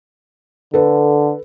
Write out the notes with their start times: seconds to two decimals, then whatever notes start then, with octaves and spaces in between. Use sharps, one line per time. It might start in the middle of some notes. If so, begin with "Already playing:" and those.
0.74 D3 A4 B4